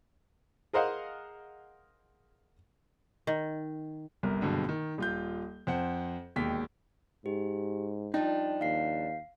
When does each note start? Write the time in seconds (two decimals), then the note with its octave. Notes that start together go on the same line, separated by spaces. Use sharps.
0.73 G#4 A#4 C5 D#5 F5 F#5
3.27 D#3
4.23 G1 C2 A#4
4.42 F#1 G2 B2 D3
4.69 D#3
4.98 D#1 F4 G6
5.67 F2 C5 F#5
6.36 E1 D#2 G5 B6
7.26 G#2 G4
8.14 F3 G3 D4 D#4 G5
8.61 D#2 F5 C7